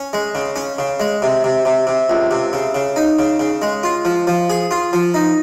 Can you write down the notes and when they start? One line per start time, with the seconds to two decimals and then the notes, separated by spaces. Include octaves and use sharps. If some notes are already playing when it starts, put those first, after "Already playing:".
Already playing: C#4
0.13 G#3
0.35 C#3
0.56 C#4
0.78 C#3
1.00 G#3
1.22 C3
1.44 C3
1.65 C3
1.87 C3
2.10 C#2
2.31 C3
2.53 C#3
2.75 C#3
2.96 D#4
3.19 C#3
3.39 C#3
3.62 G#3
3.83 F4
4.05 F3
4.27 F3
4.50 G#4
4.71 F4
4.93 F3
5.14 D#4